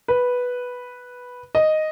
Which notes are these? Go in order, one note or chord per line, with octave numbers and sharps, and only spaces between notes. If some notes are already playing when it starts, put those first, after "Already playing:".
B4
D#5